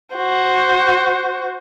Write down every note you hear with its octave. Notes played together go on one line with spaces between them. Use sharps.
F#4 C5